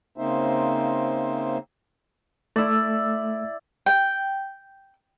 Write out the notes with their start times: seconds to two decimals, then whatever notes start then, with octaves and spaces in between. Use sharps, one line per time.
0.18 C#3 A#3 C4 D#4 C5 E5
2.56 A3 E4 D5 E6
3.86 G5